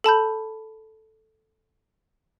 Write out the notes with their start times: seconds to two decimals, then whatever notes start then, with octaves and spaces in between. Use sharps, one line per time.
0.04 A4 A5 B5 G6